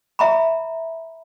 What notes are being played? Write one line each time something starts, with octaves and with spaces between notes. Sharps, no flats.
E5 A#5 B5